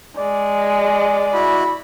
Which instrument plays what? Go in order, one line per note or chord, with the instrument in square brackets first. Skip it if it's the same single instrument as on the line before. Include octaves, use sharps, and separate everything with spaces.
[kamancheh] G#3 [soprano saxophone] D5
[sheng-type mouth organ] E4 F#4 B5